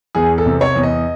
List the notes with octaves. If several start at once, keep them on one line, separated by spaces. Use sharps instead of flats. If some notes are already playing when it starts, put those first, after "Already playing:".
E2 G#4
A4
C3
C#5
E2
D#5